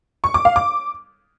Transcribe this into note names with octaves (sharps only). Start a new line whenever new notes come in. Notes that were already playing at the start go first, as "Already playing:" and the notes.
C#6
D6
F5
D6